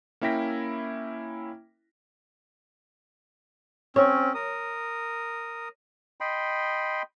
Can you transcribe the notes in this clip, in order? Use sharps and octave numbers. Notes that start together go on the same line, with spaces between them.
A#3 C#4 E4 G5 A#6 B6
C4 C#4 C#5
A#4 D#6
D#5 G5 B5 C6